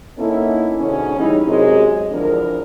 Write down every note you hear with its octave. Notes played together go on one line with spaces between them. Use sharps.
A#3 B3 C#4 D#4 E4 A4
G#2 B2 D3 C#4
A2 C#3 E3 G3 D#4 E4
F#2 C3 G#3
E2 D3 F3 D4 A#4